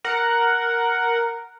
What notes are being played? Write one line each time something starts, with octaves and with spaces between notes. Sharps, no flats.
A#4 F#5